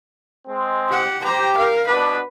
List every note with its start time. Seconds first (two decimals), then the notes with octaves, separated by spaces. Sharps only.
0.47 G#3 C4
0.88 G4 F#5
1.23 G4 C5 A#5
1.57 A#4 F5
1.87 B2 B3 D4 B4